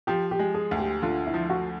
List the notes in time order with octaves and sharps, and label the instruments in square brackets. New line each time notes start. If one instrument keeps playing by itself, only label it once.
[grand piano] F3 [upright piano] G4
[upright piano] G4
[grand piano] G#3
[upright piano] G#4
[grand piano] D2
[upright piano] G4
[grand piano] D3 [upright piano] F4
[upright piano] E4
[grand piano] F3
[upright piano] F#4